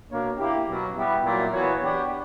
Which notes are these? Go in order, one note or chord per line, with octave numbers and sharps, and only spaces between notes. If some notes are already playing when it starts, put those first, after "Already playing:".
B2 A#3 D4 A#4 C#5
A#3 E4 G4
B2 F#3 C#4
G3 B3 E4 G4
A#2 F#3 A#3 E4
E3 B3 F#4 C#5
B3 D4 G4 C#5